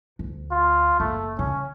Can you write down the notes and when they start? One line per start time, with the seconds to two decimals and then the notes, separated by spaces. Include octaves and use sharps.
0.19 D2
0.51 F4
1.00 F#1 A3
1.39 C#3 C#4